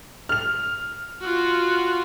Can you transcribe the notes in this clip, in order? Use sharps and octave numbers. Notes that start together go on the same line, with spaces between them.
F6 F7
F4 F#4